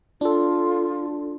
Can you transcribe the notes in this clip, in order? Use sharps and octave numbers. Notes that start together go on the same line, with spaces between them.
D4 F4 A4